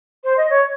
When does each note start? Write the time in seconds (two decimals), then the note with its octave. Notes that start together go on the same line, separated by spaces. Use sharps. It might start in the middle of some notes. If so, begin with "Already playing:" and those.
0.24 C5
0.37 D#5
0.50 C#5